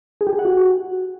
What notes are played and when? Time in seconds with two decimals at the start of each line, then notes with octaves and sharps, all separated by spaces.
0.21 G#4
0.27 G4
0.33 G#4
0.39 F#5
0.45 F#4